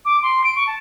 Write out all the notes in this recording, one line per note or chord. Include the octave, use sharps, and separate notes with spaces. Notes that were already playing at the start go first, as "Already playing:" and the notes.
D6
C6
D7
C#6
A5